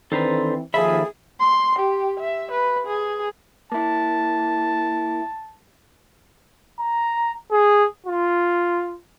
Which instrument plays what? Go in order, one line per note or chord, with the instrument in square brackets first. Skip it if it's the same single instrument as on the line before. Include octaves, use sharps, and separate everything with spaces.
[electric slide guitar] D#3 D4 B4 [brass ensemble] E3 C4 [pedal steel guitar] A4 C5 A#5
[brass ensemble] D#2 F3 [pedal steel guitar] D#3 A4 B5 [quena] G#4 [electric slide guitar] E5
[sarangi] C6
G4
E5
B4
G#4
[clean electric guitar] A#3 E4 [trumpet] A5
[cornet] A#5
G#4
F4